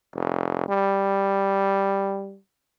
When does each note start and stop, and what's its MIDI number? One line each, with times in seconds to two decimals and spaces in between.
0.15 0.64 29
0.68 2.37 55